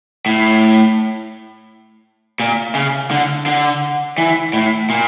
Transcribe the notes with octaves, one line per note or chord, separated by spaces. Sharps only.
A2
A#2
C#3
D3
D3
E3
A2
A#2